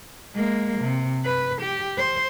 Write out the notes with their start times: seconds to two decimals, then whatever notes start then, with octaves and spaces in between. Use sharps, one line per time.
0.35 G#3 A#3
0.80 C3
1.25 B4
1.62 G4
1.97 C5